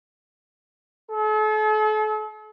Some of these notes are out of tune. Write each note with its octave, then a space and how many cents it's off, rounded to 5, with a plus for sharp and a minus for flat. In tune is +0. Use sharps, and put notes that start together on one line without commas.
A4 -40